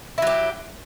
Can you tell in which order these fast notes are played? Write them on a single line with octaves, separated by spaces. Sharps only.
E4 F#3 G4